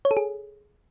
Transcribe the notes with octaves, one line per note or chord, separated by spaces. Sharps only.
C#5
A4
G#4